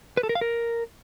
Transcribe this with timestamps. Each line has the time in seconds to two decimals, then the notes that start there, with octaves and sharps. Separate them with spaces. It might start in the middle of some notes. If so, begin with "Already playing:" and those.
0.17 B4
0.23 A4
0.29 A#4
0.35 F5
0.41 A#4